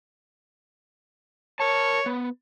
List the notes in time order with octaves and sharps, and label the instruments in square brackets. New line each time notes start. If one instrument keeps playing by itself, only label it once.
[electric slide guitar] A#4 A5 [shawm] C#5
[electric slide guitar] B3